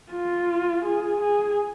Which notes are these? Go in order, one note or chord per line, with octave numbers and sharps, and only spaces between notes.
F4
G#4
G#4